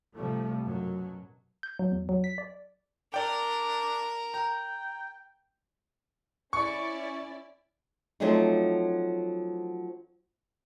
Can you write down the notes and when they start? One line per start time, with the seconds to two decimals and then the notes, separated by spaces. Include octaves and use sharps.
0.16 C3 F3 G3 A3
0.63 F#2 B2 F#3
1.63 G6
1.79 F#3
1.92 E2
2.09 F#3
2.24 B6
2.38 D5
3.14 D4 A#4 D5 G5
4.34 G5 A#5
6.53 C#4 E4 D5 C#6
8.20 F3 F#3 A3 C4 D4 D#4